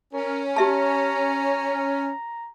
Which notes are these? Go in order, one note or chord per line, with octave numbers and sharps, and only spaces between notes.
C#4 A#4
G4 E5 A5 A#5